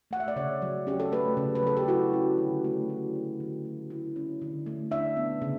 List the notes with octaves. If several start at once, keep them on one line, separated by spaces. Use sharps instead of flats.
A3 F#5
E5
D5
C#3 C#5
F#3
C#4 G4
A4
A3 B4
C#3
B4
F#3 A4
G4
E4 F#4
C#4
D3
A3
E4
C#4
D3
A3
E4
C#4
D3
A3
D4 E5
B3
C#3